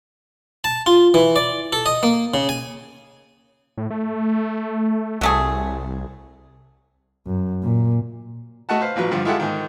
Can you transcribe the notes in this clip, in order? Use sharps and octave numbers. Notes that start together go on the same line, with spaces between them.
A5
F4
E3
D5
A4
D#5
A#3
C#3
G#5
A2
A3
C2 F#3 A3 G#4
F#2
A#2
A3 F#4 D#5 F#5 A5
B4 C5 F5
A1 F3 F#3 B4
G2 D3 F3 F4
G#3 E4 F4 G4 A4 F#5
G#2 D#3